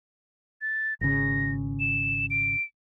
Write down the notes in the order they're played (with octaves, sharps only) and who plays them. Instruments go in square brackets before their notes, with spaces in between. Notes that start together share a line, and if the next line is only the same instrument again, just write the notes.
[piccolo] A6
[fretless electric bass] G#1 C#3 [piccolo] A#6
[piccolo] E7
D7